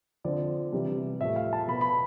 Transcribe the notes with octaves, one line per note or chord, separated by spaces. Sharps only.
D3 F3 C4 D5
C3 E3 G3
A2 F3 A3 E5
F5
A5
B2 B3 B5
B5